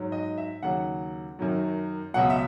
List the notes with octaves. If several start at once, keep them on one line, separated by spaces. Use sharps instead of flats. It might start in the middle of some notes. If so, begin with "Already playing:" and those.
Already playing: G#2 F#3
D#5
E5
D#2 C#3 F#3 F#5
F#2 D#3 F#3
C#2 B2 F#3 F#5
E5